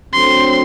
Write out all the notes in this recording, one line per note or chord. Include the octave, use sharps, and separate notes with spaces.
D2 D3 F#3 C4 C6